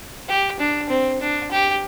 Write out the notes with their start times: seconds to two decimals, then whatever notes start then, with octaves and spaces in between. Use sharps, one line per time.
0.29 G4
0.59 D4
0.89 C4
1.21 D4
1.51 G4